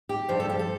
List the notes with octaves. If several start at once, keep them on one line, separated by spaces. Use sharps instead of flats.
G4
G2 F3 C5
A4
G4
A4